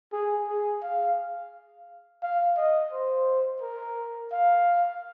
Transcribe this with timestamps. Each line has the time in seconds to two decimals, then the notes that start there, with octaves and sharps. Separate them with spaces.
0.12 G#4
0.48 G#4
0.83 F5
2.23 F5
2.57 D#5
2.92 C5
3.61 A#4
4.32 F5